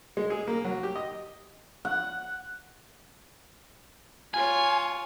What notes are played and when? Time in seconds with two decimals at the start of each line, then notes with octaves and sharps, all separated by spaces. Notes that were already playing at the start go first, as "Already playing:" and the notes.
0.17 G#3
0.30 G#4
0.48 A#3
0.64 F#3
0.83 G4
0.96 D#5
1.85 F#5
4.34 F4 C#5 G#5